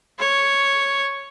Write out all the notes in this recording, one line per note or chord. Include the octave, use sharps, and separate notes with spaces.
C#5